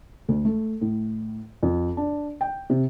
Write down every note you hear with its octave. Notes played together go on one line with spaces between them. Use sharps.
D2
A3
A2
F2
D4
G5
C3